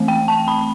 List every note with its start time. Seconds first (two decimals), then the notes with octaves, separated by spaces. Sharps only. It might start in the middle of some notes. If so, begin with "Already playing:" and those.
Already playing: E3 A3 C4
0.08 G5
0.28 A5
0.48 B5